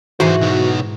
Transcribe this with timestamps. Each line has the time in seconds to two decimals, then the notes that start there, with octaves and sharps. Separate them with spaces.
0.20 B1 G#2 E3 F#4 C5 C6
0.41 B2 D#4